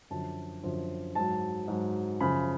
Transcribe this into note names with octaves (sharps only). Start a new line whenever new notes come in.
F#2 D3 F3 A5
F#2 D3 F3
G#2 F#3 A5
G#2 F#3
F#2 C#3 F3 B5